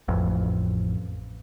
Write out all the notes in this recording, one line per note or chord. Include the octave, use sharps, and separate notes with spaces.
A1 F2